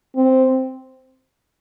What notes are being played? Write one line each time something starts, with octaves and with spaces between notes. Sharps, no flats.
C4